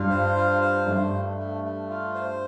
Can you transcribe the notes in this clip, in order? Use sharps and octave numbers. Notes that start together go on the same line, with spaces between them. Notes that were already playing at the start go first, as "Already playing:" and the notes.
Already playing: G2 F4
C5
F4
C5
G2 A3
A3
A3
A3
F4
C5